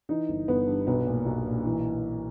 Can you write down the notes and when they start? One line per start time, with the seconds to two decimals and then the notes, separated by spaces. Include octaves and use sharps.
0.09 E3 D#4
0.29 G1
0.48 G1 B3
0.67 G2
0.87 B1 B3
1.06 A#2
1.26 B1
1.46 A#2
1.65 E3